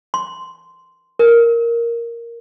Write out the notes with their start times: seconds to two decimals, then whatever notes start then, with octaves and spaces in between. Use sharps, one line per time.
0.14 C6
1.19 A#4